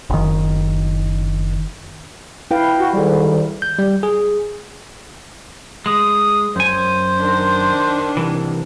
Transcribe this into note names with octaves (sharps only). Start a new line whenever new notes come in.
F#1 D#3
E4 B4 F5 G5
F#4
D2 G#2 D#3 G3
G6
G3
G#4
G#3 D#6
F#2 C5 G#5
D#3 D4
C2 E3